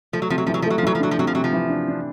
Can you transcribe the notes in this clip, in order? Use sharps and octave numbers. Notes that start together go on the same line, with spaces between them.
F3 A3
F#3
C3 F3
F#3
E3 F3
F#3
F3
F#3 A3
F3
E3 F#3
F3
F#3 D4
F3
C3 F#3
F3
C3 F#3
F3
E3
D4
D4